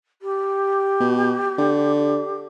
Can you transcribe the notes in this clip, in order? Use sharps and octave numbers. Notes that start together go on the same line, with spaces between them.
G4
B2
D3